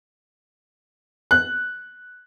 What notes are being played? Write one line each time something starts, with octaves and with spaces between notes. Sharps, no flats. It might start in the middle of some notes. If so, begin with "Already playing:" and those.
F#6